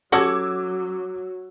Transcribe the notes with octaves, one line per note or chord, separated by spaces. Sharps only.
F#3 C#4 F#4 A4 D6 E6 G#6